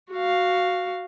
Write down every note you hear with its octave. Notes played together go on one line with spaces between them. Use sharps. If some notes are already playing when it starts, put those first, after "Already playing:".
F#4 F5